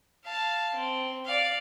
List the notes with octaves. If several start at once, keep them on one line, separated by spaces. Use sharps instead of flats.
F5 A5
C4
D5 F5